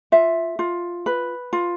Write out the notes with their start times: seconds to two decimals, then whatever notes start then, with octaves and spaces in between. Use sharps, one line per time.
0.12 F4 E5
0.59 F4
1.06 B4
1.53 F4